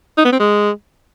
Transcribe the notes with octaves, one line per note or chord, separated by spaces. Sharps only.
D#4
B3
C4
G#3